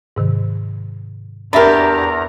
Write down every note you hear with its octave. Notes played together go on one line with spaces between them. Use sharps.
G#2 C3 D#3
E2 D4 G4 A#4 E5 A#5 B5